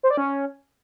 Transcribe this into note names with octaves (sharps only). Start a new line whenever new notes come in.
C5
D5
C#4